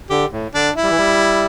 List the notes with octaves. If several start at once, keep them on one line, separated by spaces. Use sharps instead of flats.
D3 G4
A2
D3 D4
E4
G3
E3
G3